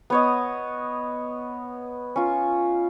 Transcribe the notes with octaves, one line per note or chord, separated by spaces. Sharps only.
B3 C#5 D#5
C#4 F4